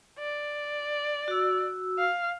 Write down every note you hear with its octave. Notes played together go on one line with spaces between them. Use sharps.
D5
F#4 E6
F5